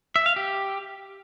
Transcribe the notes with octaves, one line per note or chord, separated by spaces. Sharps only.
E5
F5
G4